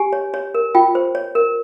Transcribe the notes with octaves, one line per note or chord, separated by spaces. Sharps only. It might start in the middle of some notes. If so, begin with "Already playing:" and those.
Already playing: G4 G#5
C#5
C#5
A#4
F4 G5
C5
C#5
A#4